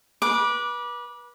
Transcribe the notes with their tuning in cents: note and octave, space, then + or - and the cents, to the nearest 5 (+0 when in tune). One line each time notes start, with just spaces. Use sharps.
B4 -30 D6 +0